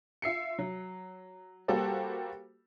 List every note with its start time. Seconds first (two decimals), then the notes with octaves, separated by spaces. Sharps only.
0.22 F4 E5 C7 C#7
0.59 F#3
1.68 G3 A#3 F#4 G4 A4 C5